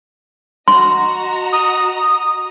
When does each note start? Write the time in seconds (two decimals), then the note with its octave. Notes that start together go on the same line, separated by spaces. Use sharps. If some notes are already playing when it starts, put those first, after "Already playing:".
0.68 F#4 D#5 A#5 C6
1.53 D#6